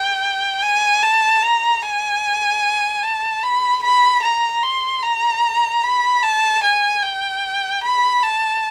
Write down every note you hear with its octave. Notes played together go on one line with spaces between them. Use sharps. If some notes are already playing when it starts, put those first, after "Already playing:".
Already playing: G5
G#5
A5
A#5
G#5
A5
B5
B5
A#5
C6
A#5
B5
A5
G#5
G5
B5
A5